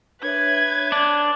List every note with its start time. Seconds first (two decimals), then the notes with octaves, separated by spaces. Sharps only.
0.22 D4 B4 C#5 E5 G#6
0.92 D4